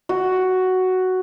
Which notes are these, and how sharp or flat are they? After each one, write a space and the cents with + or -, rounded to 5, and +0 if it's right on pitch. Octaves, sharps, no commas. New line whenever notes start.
F#4 +5